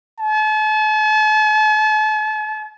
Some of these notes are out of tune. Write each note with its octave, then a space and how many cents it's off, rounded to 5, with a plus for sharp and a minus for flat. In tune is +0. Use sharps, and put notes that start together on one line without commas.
A5 -40